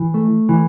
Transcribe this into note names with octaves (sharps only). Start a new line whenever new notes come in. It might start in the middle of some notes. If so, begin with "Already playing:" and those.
Already playing: E3
A3
E3